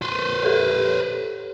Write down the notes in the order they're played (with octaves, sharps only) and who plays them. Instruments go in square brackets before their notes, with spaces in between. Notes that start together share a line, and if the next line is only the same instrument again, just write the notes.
[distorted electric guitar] B4 C5
[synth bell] G4 A4 C#5